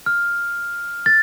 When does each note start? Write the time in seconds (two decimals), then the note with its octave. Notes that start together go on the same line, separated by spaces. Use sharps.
0.06 F6
1.06 A6